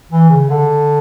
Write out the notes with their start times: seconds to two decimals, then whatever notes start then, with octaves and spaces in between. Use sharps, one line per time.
0.12 E3
0.30 C#3
0.50 D3